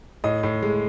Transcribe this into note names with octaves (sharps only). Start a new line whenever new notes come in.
A2 D#5
A2
G#3